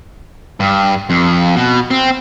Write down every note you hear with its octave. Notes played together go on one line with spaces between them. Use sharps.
G2
F2
B2
C4